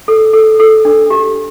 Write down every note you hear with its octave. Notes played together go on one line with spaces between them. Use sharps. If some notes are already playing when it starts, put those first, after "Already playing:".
A4
A4
A4
D4
G4